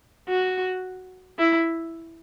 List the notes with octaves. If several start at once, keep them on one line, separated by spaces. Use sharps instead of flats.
F#4
E4